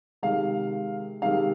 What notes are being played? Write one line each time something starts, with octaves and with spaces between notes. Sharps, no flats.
C3 D#3 G#3 F5
C3 D#3 G#3 F5